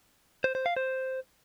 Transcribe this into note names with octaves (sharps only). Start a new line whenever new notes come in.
C5
C5
F5
C5